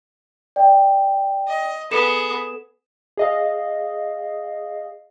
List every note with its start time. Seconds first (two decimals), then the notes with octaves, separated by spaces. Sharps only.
0.56 D5 G5
1.48 D#5
1.91 B3 G#4 A4 E7
3.17 G#4 D#5 F5